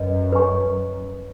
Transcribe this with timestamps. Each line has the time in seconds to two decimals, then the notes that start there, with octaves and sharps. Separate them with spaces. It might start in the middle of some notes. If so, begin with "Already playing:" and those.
Already playing: F#2 B4 D#5
0.32 B4 D#5 G#5 C#6